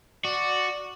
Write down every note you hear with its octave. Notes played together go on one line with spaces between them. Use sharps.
F#4 D5